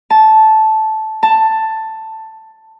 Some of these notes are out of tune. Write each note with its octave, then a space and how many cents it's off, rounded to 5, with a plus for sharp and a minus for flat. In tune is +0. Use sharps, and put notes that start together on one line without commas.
A5 -10
A5 +10